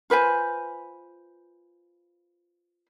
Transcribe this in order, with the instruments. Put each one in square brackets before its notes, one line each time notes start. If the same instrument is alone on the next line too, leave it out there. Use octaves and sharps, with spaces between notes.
[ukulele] F4 B4 C5 G#5